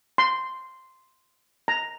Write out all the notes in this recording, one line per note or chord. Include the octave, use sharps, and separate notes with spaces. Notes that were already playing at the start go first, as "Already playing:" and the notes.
C6
A#5